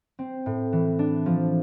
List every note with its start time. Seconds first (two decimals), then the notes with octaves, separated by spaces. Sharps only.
0.19 C4
0.46 A2
0.73 E3
0.99 D4
1.26 F3